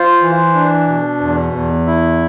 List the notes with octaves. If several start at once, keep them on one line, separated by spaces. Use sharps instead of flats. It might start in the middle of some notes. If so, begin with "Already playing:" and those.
Already playing: F4 C5
E3
D4
B2
E2
E2
E4